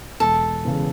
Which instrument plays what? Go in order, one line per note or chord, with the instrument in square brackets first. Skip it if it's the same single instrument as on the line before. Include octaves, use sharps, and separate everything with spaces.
[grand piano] E1 [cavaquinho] A4
[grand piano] E2 C#3